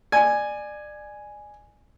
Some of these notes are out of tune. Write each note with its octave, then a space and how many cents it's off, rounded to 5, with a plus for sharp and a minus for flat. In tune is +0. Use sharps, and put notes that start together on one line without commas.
D5 +30 G#5 +0